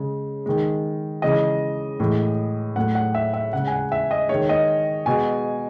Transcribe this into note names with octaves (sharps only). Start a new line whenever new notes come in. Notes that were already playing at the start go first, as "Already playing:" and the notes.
Already playing: C#3 G#3
D#3 G#3
C#3 E3 G#3 D#5
A2 E3 G#3
A2 F#3 A3 F#5
F#5
E5
E5
C#3 G#3 F#5
G#5
F#5
E5
D#5
D#3 G#3 C#5
D#5
B2 G#3 G#5